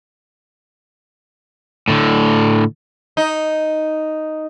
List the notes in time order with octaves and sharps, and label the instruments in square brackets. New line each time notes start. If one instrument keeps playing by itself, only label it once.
[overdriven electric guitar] A2 D3
[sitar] D#4